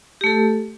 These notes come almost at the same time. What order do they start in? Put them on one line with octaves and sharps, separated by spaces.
G4 A3 A4